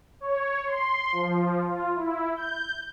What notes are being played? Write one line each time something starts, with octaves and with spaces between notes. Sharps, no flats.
C#5
C6
F3
F4
E4
G6